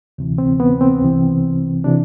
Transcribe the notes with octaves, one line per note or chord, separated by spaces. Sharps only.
D2 C3 E3
C4
B3
C4
C2 C3 E3
C3 E3 D4